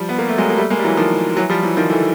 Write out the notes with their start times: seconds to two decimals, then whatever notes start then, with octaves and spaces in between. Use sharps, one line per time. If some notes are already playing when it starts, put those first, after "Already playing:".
Already playing: F3 G3
0.09 B3
0.18 A#3
0.29 A3
0.38 F#3 G#3
0.50 A#3
0.58 G3 A3
0.70 G#3 A#3
0.79 G3
0.84 E3 F#3
0.97 D#3 F3
1.37 E3 F#3
1.50 F3 G3
1.63 E3 F#3
1.77 D#3 F3
1.90 D3 E3